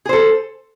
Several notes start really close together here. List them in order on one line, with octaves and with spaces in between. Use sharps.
G#4 C5 A4